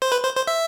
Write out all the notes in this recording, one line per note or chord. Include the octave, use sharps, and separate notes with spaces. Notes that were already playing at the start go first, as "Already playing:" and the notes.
C5
B4
C5
C5
E5